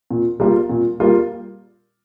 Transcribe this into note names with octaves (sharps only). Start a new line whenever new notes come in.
A#2
G3 A#3 F4 A#4
A#2
G3 A#3 F4 A#4